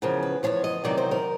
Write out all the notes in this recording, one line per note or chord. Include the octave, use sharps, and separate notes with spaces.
E2 C#3 F3 A#4
B4
E2 C#3 F3 C#5
D#5
E2 C3 D#3 F#3 D5
C5
A#4